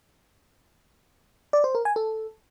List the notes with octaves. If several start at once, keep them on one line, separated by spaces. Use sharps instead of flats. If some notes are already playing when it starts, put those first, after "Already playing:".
D5
C5
A#4
G#5
A4